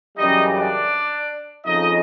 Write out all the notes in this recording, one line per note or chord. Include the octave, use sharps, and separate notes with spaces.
F#2 C#3 E3 G3 D#4 D#5
D4 D5
F2 C#3 F3 D#4 D#5